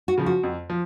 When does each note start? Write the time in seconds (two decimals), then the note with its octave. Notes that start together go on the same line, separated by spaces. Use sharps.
0.08 F#4
0.18 C#3 F3
0.26 F#4
0.43 F2
0.70 F3